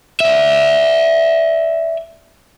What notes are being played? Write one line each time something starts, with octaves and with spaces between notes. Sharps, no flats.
D5 E5